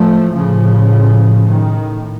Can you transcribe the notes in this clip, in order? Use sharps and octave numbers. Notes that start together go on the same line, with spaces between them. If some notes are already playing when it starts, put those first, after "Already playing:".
Already playing: A2 F3 A3
A2 C#3 F3
A2 D#3